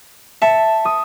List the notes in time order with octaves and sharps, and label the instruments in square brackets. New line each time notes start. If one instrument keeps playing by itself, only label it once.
[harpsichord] E5 [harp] A5 C#7
[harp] D#6